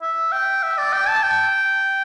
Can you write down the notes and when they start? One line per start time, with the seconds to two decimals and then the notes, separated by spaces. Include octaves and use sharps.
0.02 E5
0.32 G5
0.63 E5
0.78 D5
0.93 G5
1.08 A5
1.23 G5